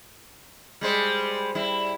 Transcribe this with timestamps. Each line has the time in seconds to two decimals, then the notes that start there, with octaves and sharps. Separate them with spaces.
0.81 G3 G#3 C5
1.55 G3 E4